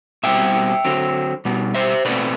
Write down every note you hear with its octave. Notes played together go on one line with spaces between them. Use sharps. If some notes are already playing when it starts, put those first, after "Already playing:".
B2 G3 C4 E5 G5
D3 F#3 C4
B2 G3 B3
C5 E5
B2 A3 C4 B4 D5